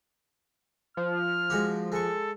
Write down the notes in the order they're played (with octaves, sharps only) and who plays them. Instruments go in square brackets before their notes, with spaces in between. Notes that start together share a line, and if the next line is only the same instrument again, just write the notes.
[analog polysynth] F3 [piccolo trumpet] F6
[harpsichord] G#3 F#4 G4
[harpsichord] G#3 C#6 [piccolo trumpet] A4